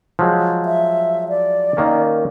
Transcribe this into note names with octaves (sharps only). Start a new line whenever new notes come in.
F3 F#3 G#3
E5
D5
D#3 A#3 C#4